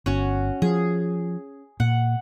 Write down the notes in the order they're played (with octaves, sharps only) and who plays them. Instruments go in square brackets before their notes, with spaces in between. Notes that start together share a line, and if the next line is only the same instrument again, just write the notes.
[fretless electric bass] G1 [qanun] C#4 F#4
[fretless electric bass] F3 [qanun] G#4
[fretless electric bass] A#2 [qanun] F#5